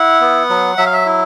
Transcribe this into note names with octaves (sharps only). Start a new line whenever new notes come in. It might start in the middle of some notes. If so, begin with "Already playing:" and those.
Already playing: E4 F#5
B3
F#3
F#3 E5
F5
E5
E4